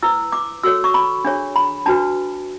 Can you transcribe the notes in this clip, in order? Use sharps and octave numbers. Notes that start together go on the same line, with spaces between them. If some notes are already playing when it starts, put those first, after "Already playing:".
E4 B4 E6
D6
F#4 A4 C#5 E6
C#6
B5
D4 G#4 C#5
B5
D4 F#4 B4 A5